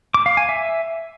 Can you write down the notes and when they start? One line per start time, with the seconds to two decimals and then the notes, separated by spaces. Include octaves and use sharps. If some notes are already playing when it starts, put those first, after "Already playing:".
0.14 D6
0.26 F5
0.37 G#5
0.49 E5